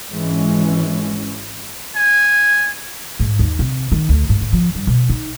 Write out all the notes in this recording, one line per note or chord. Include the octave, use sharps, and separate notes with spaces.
G#1 E3 G#3 C#4
G#5
G#2
D#2
C3
D#3
D2
G#2
G#2
F3
G2
B2
D#4